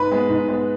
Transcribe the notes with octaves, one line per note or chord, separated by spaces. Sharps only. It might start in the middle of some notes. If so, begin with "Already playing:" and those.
Already playing: G#2 B4 B5
G#3 B3
G#2
G#3 B3